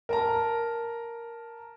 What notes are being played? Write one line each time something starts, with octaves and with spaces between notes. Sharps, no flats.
A#4 A5 A#5